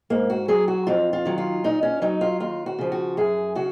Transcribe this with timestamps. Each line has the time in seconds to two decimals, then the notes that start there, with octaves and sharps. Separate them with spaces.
0.10 G#2 A#3
0.30 F#4
0.48 F#3 G#4
0.68 F#4
0.87 F2 F4
1.13 F4
1.25 D#3 F#3
1.38 F4
1.64 A#2 D#4
1.83 C#4
2.02 F#3 D#4
2.21 F4
2.40 D#2 F4
2.66 F#4
2.79 C#3 F3
2.92 F#4
3.17 F#2 G#4
3.55 C#3 F#4